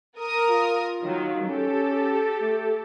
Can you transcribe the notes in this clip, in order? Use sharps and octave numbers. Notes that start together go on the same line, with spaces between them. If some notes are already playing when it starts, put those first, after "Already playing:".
A#4 D#6
F4
D#3 F#3
C#4 G4 A4
A3